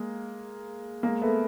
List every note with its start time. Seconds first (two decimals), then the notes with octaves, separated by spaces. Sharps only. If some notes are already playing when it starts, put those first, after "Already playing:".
Already playing: G#3 A#3
1.03 G#3 A#3
1.22 A3 B3